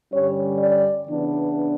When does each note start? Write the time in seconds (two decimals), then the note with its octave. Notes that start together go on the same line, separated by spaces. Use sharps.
0.12 G2 D3 G3 C#4 C#5
0.59 D5
1.07 C#3 E3 B3 D4